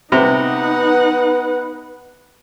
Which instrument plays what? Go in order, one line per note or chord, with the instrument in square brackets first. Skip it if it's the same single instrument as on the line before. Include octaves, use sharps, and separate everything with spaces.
[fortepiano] C3 [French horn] B3 [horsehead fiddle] D#4 F#5 [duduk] B4